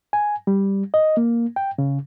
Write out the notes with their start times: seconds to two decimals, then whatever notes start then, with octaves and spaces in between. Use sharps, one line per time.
0.13 G#5
0.47 G3
0.94 D#5
1.17 A#3
1.56 G5
1.78 C#3